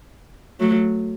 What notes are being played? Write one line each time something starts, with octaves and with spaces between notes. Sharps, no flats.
F#3 A3